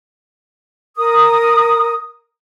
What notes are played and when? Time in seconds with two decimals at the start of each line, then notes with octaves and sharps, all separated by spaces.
0.96 A#4 D#6